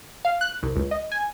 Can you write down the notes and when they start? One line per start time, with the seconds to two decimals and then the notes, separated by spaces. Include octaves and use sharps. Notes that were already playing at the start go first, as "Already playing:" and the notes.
0.25 F5
0.41 F#6
0.63 C2
0.76 C#2
0.91 D#5
1.12 G#5